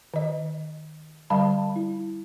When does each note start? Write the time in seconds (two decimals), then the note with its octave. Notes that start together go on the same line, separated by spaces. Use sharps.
0.14 D#3 D#5
1.30 D3 G3 F5 A5 B5
1.76 E4